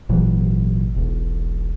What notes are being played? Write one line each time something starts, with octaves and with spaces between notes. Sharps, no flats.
G#1 A#2 E3 F#3
E1 B1